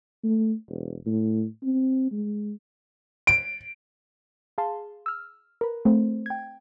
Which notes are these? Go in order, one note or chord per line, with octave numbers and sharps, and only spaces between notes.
A3
E1
A2
C4
G#3
D7
G#4 F5 A5 C6
E6 F6
A#4 B4
A3 C4 C5
G5 G#6